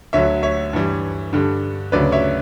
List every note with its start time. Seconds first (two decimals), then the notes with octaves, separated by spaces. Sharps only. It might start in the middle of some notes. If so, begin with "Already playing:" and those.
0.13 D2 D3 F#3 C#5 E5
0.43 C#5 E5
0.73 G2 E3 G3
1.33 G2 D3 G3
1.92 D2 C#3 F#3 B4 D5
2.12 C#5 E5